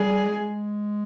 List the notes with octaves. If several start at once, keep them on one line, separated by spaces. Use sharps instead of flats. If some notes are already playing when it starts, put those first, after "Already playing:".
Already playing: G3 G#4
G#3